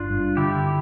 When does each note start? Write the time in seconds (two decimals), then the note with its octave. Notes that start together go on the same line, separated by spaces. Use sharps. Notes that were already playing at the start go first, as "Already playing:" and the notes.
Already playing: G1 D4 F4
0.10 G2
0.37 D3 E4 G4